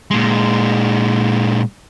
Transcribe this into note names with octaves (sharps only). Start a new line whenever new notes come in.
A#2 G#3